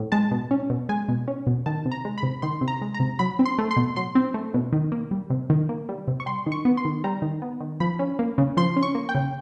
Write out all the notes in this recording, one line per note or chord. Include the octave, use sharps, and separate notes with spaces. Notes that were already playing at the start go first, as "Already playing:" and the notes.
Already playing: A2
G#3 A5
B2
C#4
B2
G#3 G#5
B2
C#4
B2
D#3 A5
C3
A#5
G#3
B5
C3
D#3 C6
C3
A#5
G#3
A#5
C3
F#3 B5
C4
C6
A3
C6
B2
F#3 C6
C4
A3
B2
D#3
A#3
G3
C3
D#3
A#3
G3
C3
C#6
G3 C6
D#3
C#6
B3
C6
D#3
G3 A#5
D#3
B3
D#3
F3 B5
C#4
A#3
C#3
F3 C6
C#4
C#6
A#3
G5
C#3